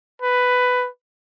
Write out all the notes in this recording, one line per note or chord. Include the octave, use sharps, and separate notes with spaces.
B4